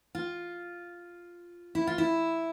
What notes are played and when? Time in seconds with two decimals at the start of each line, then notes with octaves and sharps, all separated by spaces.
0.15 F4
1.75 E4
1.87 F4
1.98 E4